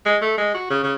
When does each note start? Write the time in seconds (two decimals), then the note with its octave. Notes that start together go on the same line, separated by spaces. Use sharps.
0.06 G#3
0.22 A3
0.38 G#3
0.55 F#4
0.70 C#3
0.83 C#3